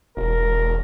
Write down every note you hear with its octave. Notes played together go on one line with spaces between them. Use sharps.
E1 A#4